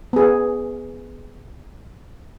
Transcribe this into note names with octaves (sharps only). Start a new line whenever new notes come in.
B3 G#4